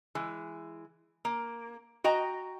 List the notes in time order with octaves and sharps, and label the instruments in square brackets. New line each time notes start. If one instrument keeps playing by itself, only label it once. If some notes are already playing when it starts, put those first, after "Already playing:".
[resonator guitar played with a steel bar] E3 G#3
A#3
F#4 D#5 G5 A#5